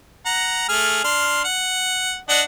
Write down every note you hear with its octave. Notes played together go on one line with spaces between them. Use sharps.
F#5 A#5
A3 G#4 F6
D4 C6 F6
F#5
D4 D#5 F#5